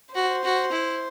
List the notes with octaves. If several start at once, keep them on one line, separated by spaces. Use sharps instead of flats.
F#4 C5
F#4
E4